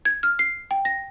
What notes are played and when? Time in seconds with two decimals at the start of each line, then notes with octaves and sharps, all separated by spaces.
0.05 G#6
0.23 F6
0.39 C7
0.71 G5
0.85 A#6